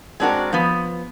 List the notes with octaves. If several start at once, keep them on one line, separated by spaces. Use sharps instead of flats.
G#3 C4 D4 F#4 A#4
F3 B3